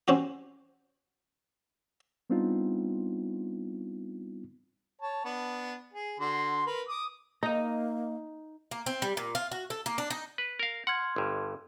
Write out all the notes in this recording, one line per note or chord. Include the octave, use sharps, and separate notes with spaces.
C4 C#4 F#4 G4
G3 B3 C4 D4 D#4 F4
C#5 A5
B3 D4
G#4
D3 F#4 C6
A#4 B4
D6 D#6
A#3 D#4 D#5 A#5
A#3
C4
G3
A#2
F4
F#4
A4
A#3
D4
D#4
B4
A#4 F5
F#5 C6 F6 G#6
G1 G2